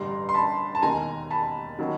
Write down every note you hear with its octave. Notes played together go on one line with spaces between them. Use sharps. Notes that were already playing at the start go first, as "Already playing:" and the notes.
Already playing: A1 G2 D3 G3 A#5 C6
C6
A5 B5
A5
E1 D#2 D#3 G#5 A#5
A5 B5
D#3 F#3 A#3 D#4